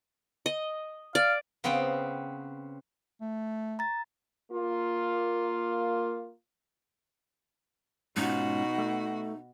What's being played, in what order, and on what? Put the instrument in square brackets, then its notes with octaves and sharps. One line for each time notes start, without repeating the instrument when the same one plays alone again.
[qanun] D#5
[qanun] D5 [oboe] F5
[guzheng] C#3 B3 C4 B4 G5
[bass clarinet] A3
[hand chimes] A#5 A6
[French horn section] A#3 F4
[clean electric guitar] G#2 C#4 F4 [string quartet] B2 F#4 [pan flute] D#4
[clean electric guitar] A3